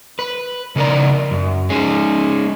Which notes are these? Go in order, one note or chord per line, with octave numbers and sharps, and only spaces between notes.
B4
C#3 B3 D#4 A#4 D5 A#5
F#2
G#3 C#4 D#4 G#4